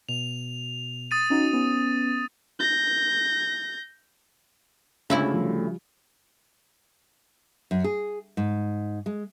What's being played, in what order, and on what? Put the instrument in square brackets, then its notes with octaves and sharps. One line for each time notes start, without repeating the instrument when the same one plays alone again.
[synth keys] B2 [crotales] F7
[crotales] D#6 A6 D#7
[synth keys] C#4 D#4 F#4
B3 C#4
[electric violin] G6 A#6
[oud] D2 E4 E5 [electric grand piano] C#3 [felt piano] G#3 F4
[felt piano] F3 G3
[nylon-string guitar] F#2
G#4
G#2
G#3